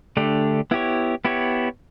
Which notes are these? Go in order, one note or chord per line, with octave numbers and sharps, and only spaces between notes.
D3 A3 D4 G4
B3 E4 G4 C#5
B3 E4 G4 C#5